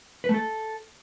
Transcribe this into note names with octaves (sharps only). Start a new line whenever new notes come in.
B4
A3
A4